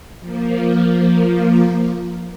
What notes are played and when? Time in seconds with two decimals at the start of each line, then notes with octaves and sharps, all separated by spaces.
0.20 F3 A#3